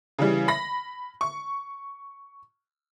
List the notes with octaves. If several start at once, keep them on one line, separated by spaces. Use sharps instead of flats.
C#3 E3 G3
B5 A#6
C#6